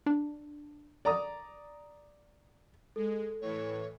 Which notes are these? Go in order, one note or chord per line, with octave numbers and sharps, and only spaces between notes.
D4
D5 A#5 D#6
G#3 A4
A2 E3 C#5